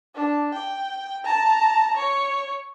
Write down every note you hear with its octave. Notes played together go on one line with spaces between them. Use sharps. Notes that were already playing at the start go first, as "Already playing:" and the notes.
D4
G5
A5 A#5
C#5